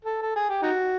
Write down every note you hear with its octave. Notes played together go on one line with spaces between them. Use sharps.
A4
A4
G#4
G4
D#4 F#4